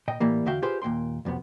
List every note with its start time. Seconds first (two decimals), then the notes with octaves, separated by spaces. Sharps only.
0.08 A#2 D#5 G5
0.20 A2 E3 G3 A#3
0.46 E2 D3 F#4 E5 F5 G5
0.62 F4 G4 G#4 B4 C5
0.82 D#2 A#2 G5 C6
1.25 B1 F2 C3 B3